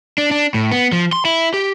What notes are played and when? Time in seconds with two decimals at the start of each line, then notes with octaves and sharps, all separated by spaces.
0.18 D4
0.31 D4
0.54 A2
0.72 B3
0.92 F3
1.13 C6
1.25 E4
1.54 G4